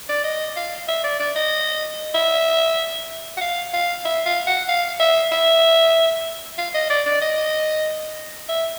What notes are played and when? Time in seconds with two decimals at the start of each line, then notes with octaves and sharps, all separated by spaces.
0.09 D5
0.24 D#5
0.56 F5
0.88 E5
1.04 D5
1.20 D5
1.36 D#5
2.15 E5
3.37 F#5
3.41 F5
3.74 F5
4.05 E5
4.26 F5
4.47 F#5
4.69 F5
5.00 E5
5.32 E5
6.58 F5
6.74 D#5
6.90 D5
7.06 D5
7.22 D#5
8.49 E5